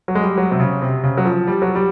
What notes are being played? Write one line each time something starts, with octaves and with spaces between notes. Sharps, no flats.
F#3
G#3
G3
F#3
C3
C#3
C3
C#3
F#3
F3
G3
F#3
G3